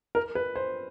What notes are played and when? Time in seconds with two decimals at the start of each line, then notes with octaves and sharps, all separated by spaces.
0.15 A#4
0.35 B4
0.56 C5